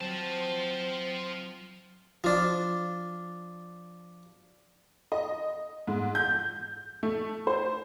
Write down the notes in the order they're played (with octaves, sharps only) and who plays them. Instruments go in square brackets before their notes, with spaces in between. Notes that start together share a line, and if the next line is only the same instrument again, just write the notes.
[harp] F#3 [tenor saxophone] C4 [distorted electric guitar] F4 A5
[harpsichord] F3 D4
[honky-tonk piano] D#5
G#2
G6
A3
C5